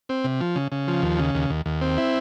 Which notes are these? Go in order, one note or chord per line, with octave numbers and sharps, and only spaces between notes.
C4
C3
F3
C#3
C#3
F3
D#2
C#3
D#2
D#2
D#2
C4
E4